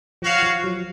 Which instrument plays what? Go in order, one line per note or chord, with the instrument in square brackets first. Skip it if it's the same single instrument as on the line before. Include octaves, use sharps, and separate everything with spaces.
[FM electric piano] F3 [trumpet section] F#4 C#5 F5
[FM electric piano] F3
F#3